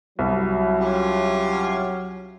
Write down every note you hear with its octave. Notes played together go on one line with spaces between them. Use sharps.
C2 F#3 E4
C#4 F4 G4